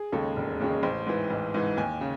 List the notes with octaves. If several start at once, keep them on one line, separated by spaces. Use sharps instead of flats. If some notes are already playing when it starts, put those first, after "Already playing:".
Already playing: G#4
D#2 C#3 G#3 A4
E1
D#2 C#3 G#3
A1 C5
G#2 E3
A1
G#2 E3
D#2 G#5
C#3